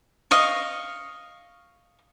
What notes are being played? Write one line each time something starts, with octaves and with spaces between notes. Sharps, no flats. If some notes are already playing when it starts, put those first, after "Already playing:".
D#5 F5 C#6